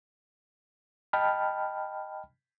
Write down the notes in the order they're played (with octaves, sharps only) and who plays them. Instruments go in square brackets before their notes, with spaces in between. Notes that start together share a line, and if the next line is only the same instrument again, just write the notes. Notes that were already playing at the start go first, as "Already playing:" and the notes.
[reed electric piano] D#5 G5 A5 B5 F6